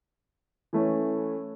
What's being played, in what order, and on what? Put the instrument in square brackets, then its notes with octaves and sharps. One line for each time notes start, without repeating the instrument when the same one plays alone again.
[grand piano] E3 A3 C#4